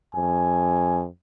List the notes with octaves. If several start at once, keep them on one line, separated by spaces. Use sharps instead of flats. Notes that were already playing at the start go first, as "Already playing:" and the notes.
F2 G#5